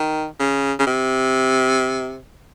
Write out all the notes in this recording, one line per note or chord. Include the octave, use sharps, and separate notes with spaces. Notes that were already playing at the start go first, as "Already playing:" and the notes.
Already playing: D#3
C#3
C#3
C3